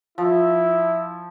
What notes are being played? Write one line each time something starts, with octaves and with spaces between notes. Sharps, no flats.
F3 E4